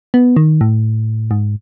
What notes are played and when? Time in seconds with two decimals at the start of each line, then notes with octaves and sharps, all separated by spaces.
0.14 B3
0.36 D#3
0.61 A2
1.31 G#2